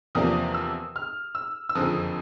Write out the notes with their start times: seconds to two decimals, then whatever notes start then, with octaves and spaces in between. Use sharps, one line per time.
0.15 E2 C3 F3 A#3 D4 D#6
0.54 E6
0.96 F6
1.35 E6
1.69 E6
1.75 F#1 F2 D3 F3 D#6